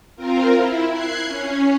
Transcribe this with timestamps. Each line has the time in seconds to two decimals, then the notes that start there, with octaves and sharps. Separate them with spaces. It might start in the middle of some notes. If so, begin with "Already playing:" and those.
0.16 C4 F4 A#4
0.52 E4
0.91 F#6 G#6 C7
1.24 C#4